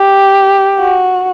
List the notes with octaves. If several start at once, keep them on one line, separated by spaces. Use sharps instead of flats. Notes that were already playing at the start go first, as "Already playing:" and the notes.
Already playing: G4
F#4